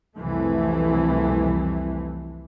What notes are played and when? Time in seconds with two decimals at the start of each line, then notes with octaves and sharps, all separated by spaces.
0.17 C2 F2 E3 A3